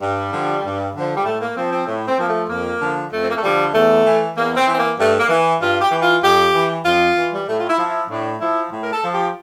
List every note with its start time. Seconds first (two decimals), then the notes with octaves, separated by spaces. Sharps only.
0.01 G2 G3
0.31 D3 F3
0.63 G2
0.94 D3 F3
1.16 G3
1.25 A2 A3
1.41 A#3
1.56 F3 C4
1.72 C4
1.87 A2
2.08 C4
2.18 F3 A#3
2.28 A3
2.49 F2 A#3
2.81 D3 F3
3.11 F2 A3
3.22 C4
3.28 A#3
3.36 A3
3.43 D3 F3 G3
3.74 E2 A3
4.04 E3
4.36 E2 A#3
4.56 C4
4.67 E3
4.73 C4
4.78 A#3
4.98 G2 A3
5.19 A#3
5.29 E3
5.61 G2 F4
5.81 G4
5.91 E3
6.01 F4
6.22 F2 G4
6.53 E3
6.84 F2 F4
7.16 E3
7.33 G3
7.47 A2 A3
7.60 F4
7.68 E4
7.78 F3
7.88 E4
8.09 A2 D4
8.40 F3 E4
8.71 A2
8.82 A#4
8.92 A4
9.03 F3
9.13 G4